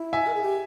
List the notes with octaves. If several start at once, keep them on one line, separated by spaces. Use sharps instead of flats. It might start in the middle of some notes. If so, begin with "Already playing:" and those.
Already playing: E4
E5 G#5
A#4
G#4
G4